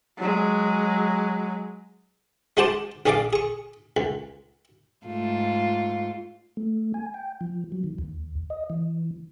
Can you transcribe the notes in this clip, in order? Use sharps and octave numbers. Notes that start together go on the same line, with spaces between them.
F#3 G#3
G#3 C#4 F#4 C5 A5 D6
A#1 C#4 G#4 D5 F5 D6
G#4 C#6
C#2
G#2 A3 F4
A3
G#5
G5
F3
F#3
D#3
D#2
D#5
E3